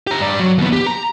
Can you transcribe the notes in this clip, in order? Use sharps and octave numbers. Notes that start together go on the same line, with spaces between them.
G4 A#5
G2 D5
F#3
D#2 B3
G4
A#5